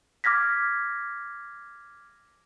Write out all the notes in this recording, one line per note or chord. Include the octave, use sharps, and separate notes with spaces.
D6 F6 G#6 A#6 B6